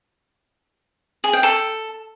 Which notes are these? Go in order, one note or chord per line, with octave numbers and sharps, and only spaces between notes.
G#4
G5
A4